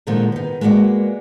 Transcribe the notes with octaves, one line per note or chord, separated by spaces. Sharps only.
A#2 D3 D#3 F3 G#3 A#3
D#3 B3
G#3 A#3 B3 D#4 F#4 D5